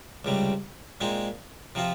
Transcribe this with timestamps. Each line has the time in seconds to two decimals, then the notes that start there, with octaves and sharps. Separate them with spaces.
0.25 C#2 C3 G3
1.01 A#2 G#3 C4 D#4
1.75 C3 F3 C4 F4